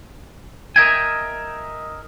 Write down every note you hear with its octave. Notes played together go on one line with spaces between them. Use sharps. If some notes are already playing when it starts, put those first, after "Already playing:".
A#4 D#5 E5 G5 G#5